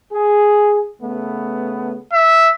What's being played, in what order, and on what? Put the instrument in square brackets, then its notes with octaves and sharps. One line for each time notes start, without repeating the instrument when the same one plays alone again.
[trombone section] G#4
C#3 A3 B3
[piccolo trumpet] E5